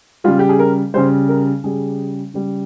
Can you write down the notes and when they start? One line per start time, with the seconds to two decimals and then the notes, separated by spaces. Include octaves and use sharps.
0.24 C#3 G3 F4
0.39 G4
0.49 G#4
0.59 A#4
0.94 C#3 G3 C5
1.29 A#4
1.64 C#3 G3 G#4
2.34 C#3 G3